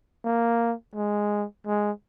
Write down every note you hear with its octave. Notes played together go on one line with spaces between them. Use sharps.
A#3
G#3
G#3